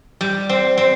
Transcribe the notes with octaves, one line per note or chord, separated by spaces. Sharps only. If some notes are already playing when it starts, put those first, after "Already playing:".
G3
C4
C4